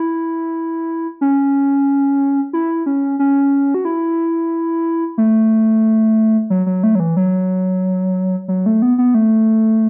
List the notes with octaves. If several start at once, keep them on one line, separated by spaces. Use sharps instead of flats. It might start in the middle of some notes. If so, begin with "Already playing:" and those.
Already playing: E4
C#4
E4
C#4
C#4
F#4
E4
A3
F#3
F#3
A3
F#3
E3
F#3
F#3
A3
B3
B3
A3